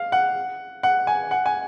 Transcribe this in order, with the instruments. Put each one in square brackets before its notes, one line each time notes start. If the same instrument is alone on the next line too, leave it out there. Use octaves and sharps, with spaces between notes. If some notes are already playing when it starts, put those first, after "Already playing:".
Already playing: [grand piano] F5
F#5
F#5
G#5
F#5
G#5